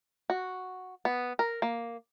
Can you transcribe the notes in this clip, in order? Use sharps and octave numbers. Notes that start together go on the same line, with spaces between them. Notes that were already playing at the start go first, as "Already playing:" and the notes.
F#4
B3
A#4
A#3